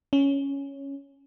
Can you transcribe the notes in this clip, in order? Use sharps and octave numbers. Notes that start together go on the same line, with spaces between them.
C#4